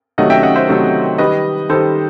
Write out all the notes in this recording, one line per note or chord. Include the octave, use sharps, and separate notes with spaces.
C3 D#3 F#3 A3 D#5 F#5
E5 G5
D#5 F#5
C5 E5
C3 D#3 F#3 A3
D#3 G3 B4 D#5
D#3 G3 A4 C5